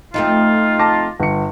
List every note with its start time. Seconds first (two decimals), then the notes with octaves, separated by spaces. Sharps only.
0.14 F2 F3 A3 D#4 F4
0.79 A5 D6 A#6
1.20 G1 C#7